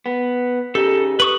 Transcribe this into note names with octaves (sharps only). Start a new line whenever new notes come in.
B3
C#3 D#4 G4 A4
B4 C#6 D#6